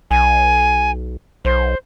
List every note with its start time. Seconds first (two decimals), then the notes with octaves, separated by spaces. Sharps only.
0.11 B1 G#5
1.45 B1 C5